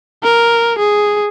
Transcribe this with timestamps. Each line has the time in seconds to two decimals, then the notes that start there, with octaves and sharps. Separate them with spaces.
0.24 A#4
0.79 G#4